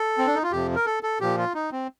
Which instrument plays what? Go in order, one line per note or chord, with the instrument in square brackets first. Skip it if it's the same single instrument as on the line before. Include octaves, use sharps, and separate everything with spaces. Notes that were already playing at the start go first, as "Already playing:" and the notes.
Already playing: [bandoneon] A4
C4
D4
D#4
F4
F2 C3 F3 G4
A#4
A4
A4
A#2 F3 G4
F4
D#4
C4